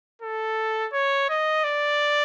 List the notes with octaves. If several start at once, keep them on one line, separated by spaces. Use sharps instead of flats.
A4
C#5
D#5
D5